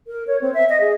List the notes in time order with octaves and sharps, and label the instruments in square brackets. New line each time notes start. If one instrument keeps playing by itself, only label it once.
[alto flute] A#4
C#5
C4
E5
D#5
G#4